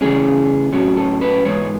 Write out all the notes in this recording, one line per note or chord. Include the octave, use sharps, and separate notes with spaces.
C#3 E3 A3 C#4 G#4
A2 F#3 A3 C#4 F#4
A4
B4
G#2 E3 B3 C#5